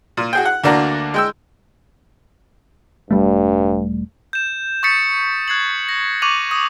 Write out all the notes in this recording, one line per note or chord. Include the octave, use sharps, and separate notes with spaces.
A#2
F#4 G#4 G5
F#5
D2 A#3 D4 F#4 A#5
G#3 G5 E6
E1 G2 G3 A3
G6 E7
C#6 D#6 G6 A6 B6 C#7
F#6 G#6 C7 F#7
A#6
C#6 D6 F#6 D#7 F7 F#7
D#6